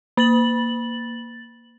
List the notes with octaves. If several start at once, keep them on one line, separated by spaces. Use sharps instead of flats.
A#3 A6 F#7